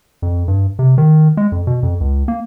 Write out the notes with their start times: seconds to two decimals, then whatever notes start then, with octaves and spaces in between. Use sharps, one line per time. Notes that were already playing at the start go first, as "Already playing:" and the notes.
0.22 F2
0.48 G2
0.79 C3
0.98 D#3
1.37 G#3
1.52 F2
1.67 B2
1.83 F2
2.01 C#2
2.28 A#3